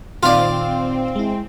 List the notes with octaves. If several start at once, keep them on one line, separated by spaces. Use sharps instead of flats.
A#2 D#3 C4 F4 D5 F5
G#3 E4